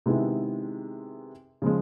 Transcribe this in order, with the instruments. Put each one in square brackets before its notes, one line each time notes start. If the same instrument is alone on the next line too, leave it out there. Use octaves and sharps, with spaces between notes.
[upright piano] C3 D#3 G#3 B3 E4
C#3 F3 G#3